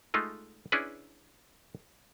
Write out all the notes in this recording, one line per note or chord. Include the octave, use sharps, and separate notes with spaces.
G#3 A3 D#4 F4
C#4 D4 E4 G#4 B4